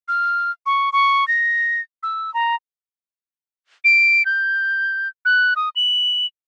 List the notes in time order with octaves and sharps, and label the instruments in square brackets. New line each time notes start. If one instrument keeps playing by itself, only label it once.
[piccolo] F6
C#6
C#6
A#6
E6
A#5
D7
G6
F#6
D#6
F#7